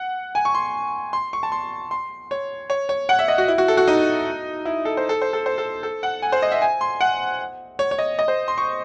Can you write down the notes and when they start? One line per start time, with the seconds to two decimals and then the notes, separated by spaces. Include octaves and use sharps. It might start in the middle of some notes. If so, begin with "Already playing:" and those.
Already playing: F#5
0.35 G#5
0.45 C#6
0.55 C6
1.13 C6
1.33 C#6
1.43 A5
1.52 C6
1.91 C6
2.31 C#5
2.70 C#5
2.89 C#5
3.09 F#5
3.19 E5
3.28 D#5
3.38 F#4
3.48 E4
3.58 F#4
3.68 A4
3.77 F#4
3.88 D#4
4.65 E4
4.85 A4
4.97 C5
5.09 A4
5.22 C5
5.33 A4
5.46 C5
5.58 A4
5.83 A4
6.03 F#5
6.22 G#5
6.32 C5
6.42 D#5
6.52 E5
6.62 G#5
6.81 C6
7.01 F#5
7.79 C#5
7.91 C#5
7.99 D#5
8.19 D#5
8.28 C5
8.48 C6
8.58 C#6